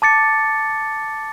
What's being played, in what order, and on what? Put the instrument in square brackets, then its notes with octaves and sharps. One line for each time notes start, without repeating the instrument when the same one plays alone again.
[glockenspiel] A5 D6 A6 C#7